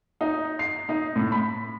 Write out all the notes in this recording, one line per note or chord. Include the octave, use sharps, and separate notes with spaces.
D#4
C7
D#4
A2
B5